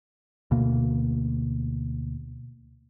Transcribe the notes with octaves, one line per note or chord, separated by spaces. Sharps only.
D2 B2 A#3